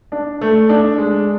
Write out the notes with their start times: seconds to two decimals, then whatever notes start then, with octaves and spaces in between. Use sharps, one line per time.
0.12 D4
0.41 A3
0.69 D4
0.98 G#3